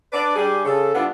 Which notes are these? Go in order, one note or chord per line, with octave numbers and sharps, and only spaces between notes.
D4 B4 D5
G2 G3 G4 G#4
C#3 A4
G2 B3 D4 E4 F4